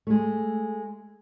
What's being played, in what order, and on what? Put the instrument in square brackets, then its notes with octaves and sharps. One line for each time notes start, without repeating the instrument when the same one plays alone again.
[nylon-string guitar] G#3 A3